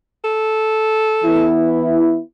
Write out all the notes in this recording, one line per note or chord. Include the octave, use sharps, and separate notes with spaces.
A4
E3 B3 E4